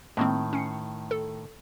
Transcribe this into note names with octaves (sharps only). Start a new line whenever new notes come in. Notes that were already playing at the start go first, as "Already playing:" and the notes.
A2 D#3 G#3 A#3 C4
C#4 C7 C#7
A4